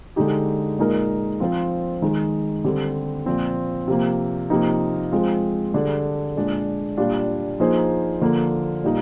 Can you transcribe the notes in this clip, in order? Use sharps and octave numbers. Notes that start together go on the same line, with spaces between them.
D3 G#3 D#4 G4
A#2 G#3 D#4 A#4
F3 C4 F4 C5
D#3 G#3 D#4
D3 G3 C4 G4
A#2 F3 C4
C3 F3 A#3
C3 F3 A#3 D#4
F3 G#3 C4 F4
D3 G3 D4 G#4
A#2 G#3 D4
A#2 G3 D4 F4
F3 A#3 D#4 G#4 C5
D3 F3 A#3
A#2 G3 A#3 D#4